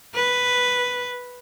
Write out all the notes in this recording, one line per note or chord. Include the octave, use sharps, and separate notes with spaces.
B4